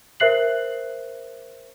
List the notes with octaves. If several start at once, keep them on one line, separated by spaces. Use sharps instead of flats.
A#4 C5 E5 F#6 C7 F#7